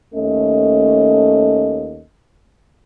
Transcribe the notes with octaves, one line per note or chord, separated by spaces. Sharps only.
D#2 A3 C#4 A4 D#5